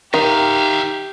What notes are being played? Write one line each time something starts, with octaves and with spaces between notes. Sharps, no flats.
D#3 G4 E5 F5